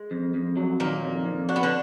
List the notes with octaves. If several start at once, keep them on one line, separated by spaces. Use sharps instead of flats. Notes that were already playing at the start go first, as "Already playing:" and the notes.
Already playing: G#3
F2
F2
F#3
A#2 D#3 A#3
F2
F2
D4 F#4
B3
D3 D4